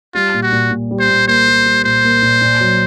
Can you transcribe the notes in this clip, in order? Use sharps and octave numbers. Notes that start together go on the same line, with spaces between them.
G3 F4
A#2
F#4
A#2
A#2
G3
C5
A#2
A#3 C5
G3
G3
A#2 C5
A#3
A#2
A#2
F#3